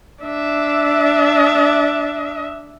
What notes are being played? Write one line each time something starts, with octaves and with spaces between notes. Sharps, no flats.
D4 E5